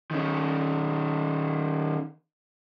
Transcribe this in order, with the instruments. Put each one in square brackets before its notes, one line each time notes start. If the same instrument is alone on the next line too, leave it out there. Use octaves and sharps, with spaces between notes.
[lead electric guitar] D#3 C#4